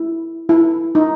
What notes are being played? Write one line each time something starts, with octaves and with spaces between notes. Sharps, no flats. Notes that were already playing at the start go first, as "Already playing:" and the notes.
Already playing: E4
E4
D#4